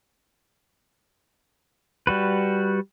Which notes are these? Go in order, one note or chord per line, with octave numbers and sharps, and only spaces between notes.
G3 F#4 B4